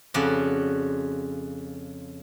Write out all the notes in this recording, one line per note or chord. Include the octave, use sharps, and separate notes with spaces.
F2 C#3 F#4 D5